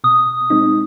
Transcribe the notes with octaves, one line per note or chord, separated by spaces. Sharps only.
B2 D#6
G#3 C4 D#4